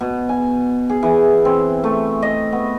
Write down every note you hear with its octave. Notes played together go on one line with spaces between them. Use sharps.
B2
G#5
G#4
E3
C4
A3
D#5
B3